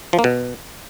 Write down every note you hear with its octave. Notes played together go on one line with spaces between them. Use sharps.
F3
A#3
B2